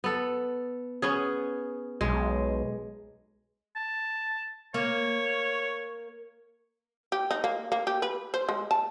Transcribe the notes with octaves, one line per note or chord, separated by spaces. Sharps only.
B3 A4
B3 C#4 G#4
B1 G#3
A5
A#3 C#5
G4
D#4
A#3
A#3
G4
B4
C5
G#3
A5